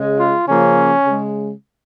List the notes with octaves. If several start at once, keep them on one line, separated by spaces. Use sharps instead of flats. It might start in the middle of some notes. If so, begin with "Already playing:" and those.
Already playing: C#3 G#3
F4
C#3 F3 A#3 C#4
C#3 G#3